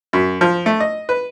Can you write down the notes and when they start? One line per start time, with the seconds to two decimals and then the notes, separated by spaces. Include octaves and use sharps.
0.13 F#2
0.41 F3
0.66 A3
0.80 D#5
1.09 B4